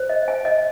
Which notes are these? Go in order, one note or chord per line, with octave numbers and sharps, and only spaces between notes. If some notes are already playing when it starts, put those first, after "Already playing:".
Already playing: C5
D#5
G#5
D#5